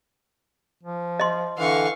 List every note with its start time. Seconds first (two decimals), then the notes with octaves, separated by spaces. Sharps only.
0.83 F3
1.20 D#5 C6
1.58 D3 E3 F5 C#6